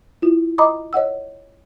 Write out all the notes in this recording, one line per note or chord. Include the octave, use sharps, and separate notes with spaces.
E4 F4
D#5 A#5 B5 D6 D#6
C#5 D#5 F#5 E6